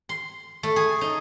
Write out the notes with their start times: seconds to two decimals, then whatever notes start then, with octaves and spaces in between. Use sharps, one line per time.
0.09 C6
0.63 A3
0.76 G#4
1.01 D#4